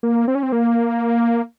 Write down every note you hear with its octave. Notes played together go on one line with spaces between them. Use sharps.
A#3
C4
C#4
C4
A#3